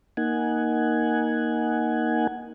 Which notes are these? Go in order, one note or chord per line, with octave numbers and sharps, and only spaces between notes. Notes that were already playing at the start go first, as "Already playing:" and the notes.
A#3 D#4 F#5 G#5